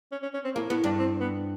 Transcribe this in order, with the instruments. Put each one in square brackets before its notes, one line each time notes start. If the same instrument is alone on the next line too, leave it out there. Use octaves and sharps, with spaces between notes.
[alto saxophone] C#4
C#4
C#4
C4
[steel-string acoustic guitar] A2 [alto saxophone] A#3
[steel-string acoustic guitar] A2 [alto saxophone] B3
[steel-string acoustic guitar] G2 [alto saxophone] D4
[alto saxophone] C4
B3